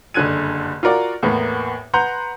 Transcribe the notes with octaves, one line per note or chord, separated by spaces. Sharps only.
F#1 G2 D3 F#6 G#6 D#7
F4 F#4 A#4 D5
E2 A2 A#3 B3
B4 F#5 A#5 C6 G6